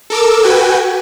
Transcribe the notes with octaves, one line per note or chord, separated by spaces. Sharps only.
A4 A#4 D6 E6
F#4 B4 G5 G#5